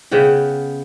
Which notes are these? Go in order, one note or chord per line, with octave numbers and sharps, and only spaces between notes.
C#3 B3 F#5 G5